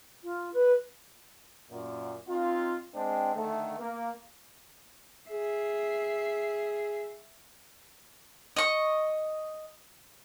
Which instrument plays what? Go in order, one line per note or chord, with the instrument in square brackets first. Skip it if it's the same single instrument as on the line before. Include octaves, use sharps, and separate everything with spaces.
[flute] F4
B4
[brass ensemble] F#2 A#2
C4 D#4 F4
G#3 C4 D4 C5 G5
D3 D#3 A3
A#3
[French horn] G#4 [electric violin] E5 C7
[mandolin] D#5 C#6